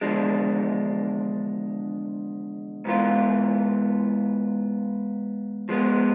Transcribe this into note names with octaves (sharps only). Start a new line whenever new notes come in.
E2 D3 F3 G#3 D4
G#2 E3 B3 F4
F3 G#3 B3